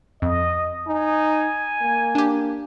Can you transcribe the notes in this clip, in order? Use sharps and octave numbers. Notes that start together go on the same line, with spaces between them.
F2 D#5
D#4 G#5
A#3
D4 G4